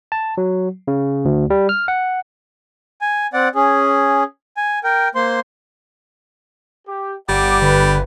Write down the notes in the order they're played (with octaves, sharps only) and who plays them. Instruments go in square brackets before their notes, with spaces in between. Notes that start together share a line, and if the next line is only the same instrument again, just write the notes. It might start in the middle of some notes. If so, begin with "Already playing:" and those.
[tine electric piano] A5
F#3
C#3
D2
G3
F6
F#5
[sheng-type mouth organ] G#5
C4 D5 F#5
C#4 G#4
G#5
A#4 G5
A#3 C5 C6
[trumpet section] G4
[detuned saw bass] G1 [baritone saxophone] G3 [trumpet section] F#5 D6
[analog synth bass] D3 [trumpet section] B4